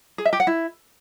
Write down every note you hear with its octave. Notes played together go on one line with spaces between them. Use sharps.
G#4
E5
G4
F#5
E4